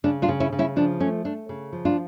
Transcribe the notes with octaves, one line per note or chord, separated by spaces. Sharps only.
C#3 D4
D4 F4
C#3
C#4 E4
C#3
C#4 E4
F3 D4
A3 C#4
A3 D4
C#3
F3
D4 F4